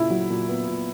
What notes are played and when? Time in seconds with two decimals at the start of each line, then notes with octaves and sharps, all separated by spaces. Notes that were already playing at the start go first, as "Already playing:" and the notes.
Already playing: A#2 C#3 E4
0.10 F#3
0.30 A#2
0.49 B3
0.68 A#2